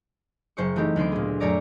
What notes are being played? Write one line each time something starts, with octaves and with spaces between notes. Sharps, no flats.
F#1 C5 C#6
E3 A3 C4 D#4 G4
D2 B3 C6 D6
A#2 G#4
F#2 A3 C#5 D5 A#5 D6